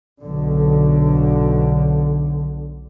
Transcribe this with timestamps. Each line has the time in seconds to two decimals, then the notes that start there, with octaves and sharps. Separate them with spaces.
0.25 B1 D3